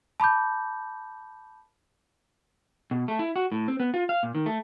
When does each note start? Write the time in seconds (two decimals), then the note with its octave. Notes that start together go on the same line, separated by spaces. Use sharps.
0.20 A5 B5 D6 G6
2.91 B2
3.08 A3
3.19 E4
3.36 F#4
3.52 A2
3.68 C4
3.80 B3
3.94 F4
4.09 F5
4.23 A#2
4.35 D#3
4.46 A3